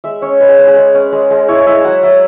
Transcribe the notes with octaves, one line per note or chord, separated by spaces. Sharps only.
G#3 E5
C#4 C#5
G#3 B4
G#4
G#3 B4
G#4
G#3
C#4
G#3
G#3
E4 C#5
E4 E5
F#3 F#5
F#3 E5